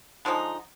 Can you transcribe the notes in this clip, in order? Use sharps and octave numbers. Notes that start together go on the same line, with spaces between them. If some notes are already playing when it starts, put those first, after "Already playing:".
D3 F3 G#3 D#4